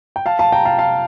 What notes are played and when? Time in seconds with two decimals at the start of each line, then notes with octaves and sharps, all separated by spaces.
0.16 G5
0.26 F5 A5
0.39 F5 A5
0.52 G5 A#5
0.65 F5 A5
0.79 F5 A5